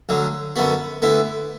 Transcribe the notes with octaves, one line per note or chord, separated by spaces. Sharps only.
D2 D3 F#3
F#2 D3 B3 F#4
D2 D3 B3 E4